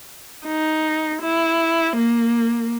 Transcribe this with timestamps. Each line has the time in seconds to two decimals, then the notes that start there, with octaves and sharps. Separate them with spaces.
0.46 D#4
1.22 E4
1.96 A#3